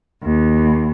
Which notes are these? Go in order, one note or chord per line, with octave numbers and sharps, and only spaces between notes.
D#2